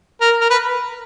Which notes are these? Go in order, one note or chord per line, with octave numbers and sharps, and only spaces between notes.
A#4
A#4
B4